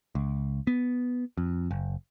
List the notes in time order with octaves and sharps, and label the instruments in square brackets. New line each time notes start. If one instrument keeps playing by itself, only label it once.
[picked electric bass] C#2
B3
F2
F#1